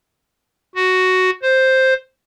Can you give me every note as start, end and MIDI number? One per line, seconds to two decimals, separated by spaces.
0.75 1.30 66
1.42 1.93 72